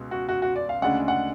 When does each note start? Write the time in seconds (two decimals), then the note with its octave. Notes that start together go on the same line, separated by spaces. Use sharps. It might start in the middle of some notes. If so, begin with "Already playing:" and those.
Already playing: C#2 B2
0.11 F#4
0.29 F#4
0.42 F#4
0.56 D5
0.69 F5
0.82 D2 C#3 G#3 D4 F#5
1.08 F#5